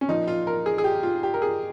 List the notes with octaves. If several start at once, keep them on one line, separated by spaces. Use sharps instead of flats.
C#4
A#2 F3 D#4
F4
A#4
G#4
G#4
G4
F4
G4
A#4
G#4